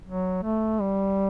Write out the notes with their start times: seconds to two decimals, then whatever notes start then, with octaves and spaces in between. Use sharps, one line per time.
0.06 F#3
0.43 A3
0.81 G3